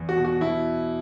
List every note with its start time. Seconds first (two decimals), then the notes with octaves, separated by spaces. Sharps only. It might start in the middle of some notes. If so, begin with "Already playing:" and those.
Already playing: E2
0.09 F#4
0.17 B2
0.25 F#4
0.40 B2 E4